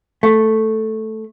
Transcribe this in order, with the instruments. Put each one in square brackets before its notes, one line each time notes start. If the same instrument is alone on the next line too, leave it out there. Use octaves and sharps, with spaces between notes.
[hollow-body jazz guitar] A3